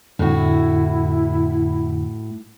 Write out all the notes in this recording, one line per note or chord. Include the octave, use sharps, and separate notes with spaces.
F2 A2 D3 E4 F#4